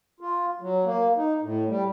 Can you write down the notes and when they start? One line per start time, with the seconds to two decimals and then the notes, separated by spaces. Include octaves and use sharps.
0.20 F4
0.61 F#3
0.85 A#3
1.17 D#4
1.42 A2
1.68 G3